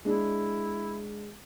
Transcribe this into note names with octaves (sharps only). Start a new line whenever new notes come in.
G#3 D4 E4